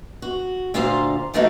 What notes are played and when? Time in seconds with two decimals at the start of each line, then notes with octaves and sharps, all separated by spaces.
0.22 F#4
0.74 D2 A#2 F4 C5 F5 A#5
1.34 E3 F3 A3 A#3 D#4 F#4